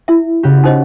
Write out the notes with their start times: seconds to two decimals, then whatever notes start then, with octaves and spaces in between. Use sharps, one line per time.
0.08 E4 E5
0.43 C#3 F#4 G4
0.64 D#4 C5 D#5